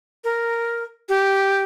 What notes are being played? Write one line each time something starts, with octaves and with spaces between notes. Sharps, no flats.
A#4
G4